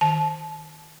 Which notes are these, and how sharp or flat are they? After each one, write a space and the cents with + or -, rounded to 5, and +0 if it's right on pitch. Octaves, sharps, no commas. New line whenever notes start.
D#3 +5 A5 -25